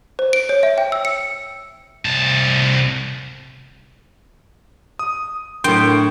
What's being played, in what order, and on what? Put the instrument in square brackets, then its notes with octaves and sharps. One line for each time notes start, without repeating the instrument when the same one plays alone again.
[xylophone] C5
D7
C#5
E5
G5
E6
C#7
[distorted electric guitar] C2 A5
[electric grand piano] D#6
[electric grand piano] A2 C6 [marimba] F#3 D4 A#4 [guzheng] G5